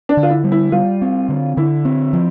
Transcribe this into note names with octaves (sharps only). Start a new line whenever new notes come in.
D4
D3
F4
E4
G3
E4
G3 F4
C4
D3
D3 E4
C4
F3